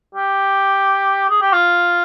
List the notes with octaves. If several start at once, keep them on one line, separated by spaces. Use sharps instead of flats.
G4
G#4
G4
F4